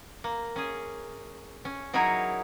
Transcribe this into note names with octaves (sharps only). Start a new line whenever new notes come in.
A#3
C#4 G#4
C#4
F#3 D#4 E4 G#4 A#4 C#5